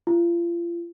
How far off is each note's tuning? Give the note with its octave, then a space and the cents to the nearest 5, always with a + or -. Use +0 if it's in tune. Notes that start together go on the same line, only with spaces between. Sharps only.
F4 -35